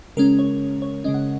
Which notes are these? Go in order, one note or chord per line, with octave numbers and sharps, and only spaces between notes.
C#3 G#3 C#4 A#4
C#5
C#5
C#3 G#3 C#4 D#5
F#5